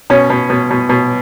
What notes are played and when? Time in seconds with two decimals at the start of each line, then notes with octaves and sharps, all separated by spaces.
0.10 B2 C#4
0.30 B2
0.50 B2
0.70 B2
0.89 B2